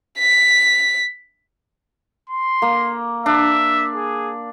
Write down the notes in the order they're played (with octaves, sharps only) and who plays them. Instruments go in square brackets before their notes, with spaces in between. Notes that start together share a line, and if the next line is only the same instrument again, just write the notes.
[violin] B6
[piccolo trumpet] C6
[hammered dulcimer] A#3
[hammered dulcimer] D4 [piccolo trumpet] E5
[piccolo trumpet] G#4